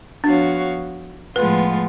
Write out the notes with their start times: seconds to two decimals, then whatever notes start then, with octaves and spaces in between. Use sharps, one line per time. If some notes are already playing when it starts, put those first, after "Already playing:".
0.23 F3 B3 D4 F#4 C#5 F5
1.35 A2 F3 G#3 B3 F4 B4